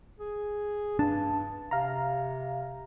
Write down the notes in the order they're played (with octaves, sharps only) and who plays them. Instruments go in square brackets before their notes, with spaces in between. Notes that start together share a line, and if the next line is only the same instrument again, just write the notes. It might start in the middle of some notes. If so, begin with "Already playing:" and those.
[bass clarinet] G#4
[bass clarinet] G2 [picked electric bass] D4 [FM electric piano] A5
[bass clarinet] C3 [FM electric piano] F5 A#5